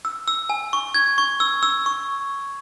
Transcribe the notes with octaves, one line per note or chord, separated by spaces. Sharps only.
E6
E6
G#5
C#6
G#6
C#6
E6
E6
C#6